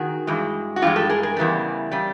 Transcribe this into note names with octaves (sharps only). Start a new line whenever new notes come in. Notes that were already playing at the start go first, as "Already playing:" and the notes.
Already playing: D#3 F#4 G#4
G2 E3 G#3
F#4
G2 E3 G#3 F4 G4
G4 A4
G#4 A#4
G#4 A#4
E2 C#3 E3 G3
C#3 G3